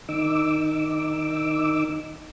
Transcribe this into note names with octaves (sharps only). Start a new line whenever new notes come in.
D#3 D#4 D6 E6